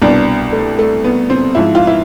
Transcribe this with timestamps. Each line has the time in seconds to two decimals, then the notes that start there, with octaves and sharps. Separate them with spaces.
0.02 C2 B2 D4
0.52 A3
0.79 A3
1.04 B3
1.30 C4
1.55 G#2 F3 E4
1.75 F4
1.87 E4